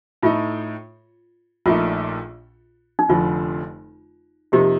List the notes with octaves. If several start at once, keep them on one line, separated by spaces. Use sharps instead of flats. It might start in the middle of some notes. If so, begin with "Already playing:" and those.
A2 A3 D#4 F4
A#1 A#2 A3 D#4 F4
D#4
F1 F2 D3 F3 F4
F2 C3 F3 A#3 D#4 G4